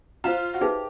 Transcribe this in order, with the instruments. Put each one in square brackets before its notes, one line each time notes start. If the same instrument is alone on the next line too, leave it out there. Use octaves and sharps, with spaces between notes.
[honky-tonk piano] F4 [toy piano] C5 F5 A#5
[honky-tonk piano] F#4
[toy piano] D#4 G#4 B4 E5 [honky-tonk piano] G4